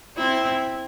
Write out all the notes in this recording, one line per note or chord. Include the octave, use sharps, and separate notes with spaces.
C4 E4